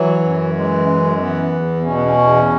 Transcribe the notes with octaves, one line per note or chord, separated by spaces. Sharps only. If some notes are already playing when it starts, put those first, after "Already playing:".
Already playing: E3 F#3
F#2
E3 G#3
F#2
E3 B3
E2
B2 C#4
B3
C#4
E2